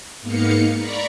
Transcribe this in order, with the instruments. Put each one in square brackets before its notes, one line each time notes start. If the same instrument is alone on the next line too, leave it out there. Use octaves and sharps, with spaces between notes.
[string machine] G#2 A#3 B3 D#4 F5 C#7
D5 A#5 B5 C#6